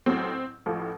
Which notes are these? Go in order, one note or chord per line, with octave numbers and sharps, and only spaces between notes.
A1 A2 F#3 C4
A1 A2 F3